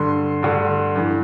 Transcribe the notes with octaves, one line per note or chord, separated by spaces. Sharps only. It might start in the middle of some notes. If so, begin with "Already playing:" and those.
Already playing: G2 D3 C6
G2 D3
G2 E3